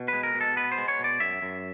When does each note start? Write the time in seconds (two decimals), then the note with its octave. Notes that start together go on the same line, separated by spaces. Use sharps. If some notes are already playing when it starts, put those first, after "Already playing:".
Already playing: B2
0.08 G#3 B4
0.23 A#4
0.35 B2
0.41 A4
0.56 B3 B4
0.72 C5
0.78 G#3
0.88 C#5
0.99 B2 D5
1.20 F#2 E5
1.42 F#2